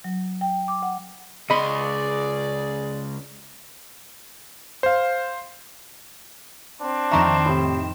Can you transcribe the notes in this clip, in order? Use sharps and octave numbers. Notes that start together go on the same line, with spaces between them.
F#3
G5
D6
F#5
C#2 G#4 D5 D#5 B5 C6
C5 F5
C4 D4
F2 D#3 E5 A#5 C#6 E7
A2 C3